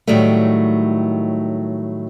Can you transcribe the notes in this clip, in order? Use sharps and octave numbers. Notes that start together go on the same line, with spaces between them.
A2 D#3 F#3 G3 A3